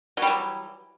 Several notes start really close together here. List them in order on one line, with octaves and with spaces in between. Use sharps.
F#3 G3 E3